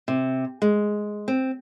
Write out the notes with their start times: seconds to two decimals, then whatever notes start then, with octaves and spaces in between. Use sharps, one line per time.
0.08 C3
0.62 G#3
1.28 C4